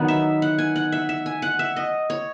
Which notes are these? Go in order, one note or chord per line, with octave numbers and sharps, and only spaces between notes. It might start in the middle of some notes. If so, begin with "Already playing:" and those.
Already playing: D#3 F#3 B3 D#4 F#5
E5
F#5
G#5
F#5
E5
E5
G#5
F#5
E5
D#5
C#5